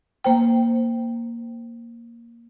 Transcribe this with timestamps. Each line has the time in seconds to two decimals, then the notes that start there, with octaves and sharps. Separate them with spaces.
0.24 A#3 C5 G5